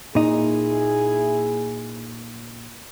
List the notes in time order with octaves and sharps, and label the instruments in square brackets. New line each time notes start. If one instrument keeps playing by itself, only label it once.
[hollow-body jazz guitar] A#2 D#4 [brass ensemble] E4 G#4